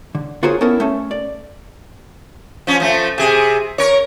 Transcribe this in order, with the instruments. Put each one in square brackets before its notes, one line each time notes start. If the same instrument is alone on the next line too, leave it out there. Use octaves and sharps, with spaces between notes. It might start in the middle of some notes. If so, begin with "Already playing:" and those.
[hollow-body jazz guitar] D3
F4 F#4 G#4 A#4 C5 C#5
B3 C#4 E4 A4 A#4
A3 C#4 A4
D5
[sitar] F3 C#4
F3 A3
C3 G#4
A#4 C#5